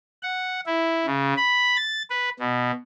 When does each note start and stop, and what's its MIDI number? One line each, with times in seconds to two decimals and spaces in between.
0.23 0.60 78
0.66 1.06 64
1.06 1.34 49
1.36 1.76 83
1.77 2.02 93
2.10 2.29 71
2.39 2.71 47